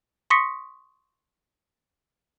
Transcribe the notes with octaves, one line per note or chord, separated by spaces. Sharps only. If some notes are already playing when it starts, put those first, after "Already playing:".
C6 C#6 D#6 A#6 B6 C#7